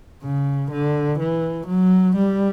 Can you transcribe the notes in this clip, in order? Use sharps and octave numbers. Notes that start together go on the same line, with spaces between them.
C#3
D3
E3
F#3
G3